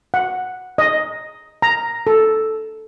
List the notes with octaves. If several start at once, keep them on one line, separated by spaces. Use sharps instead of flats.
F#5
D#5
A#5
A4